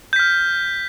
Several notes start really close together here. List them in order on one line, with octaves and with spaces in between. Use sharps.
G6 B6 F6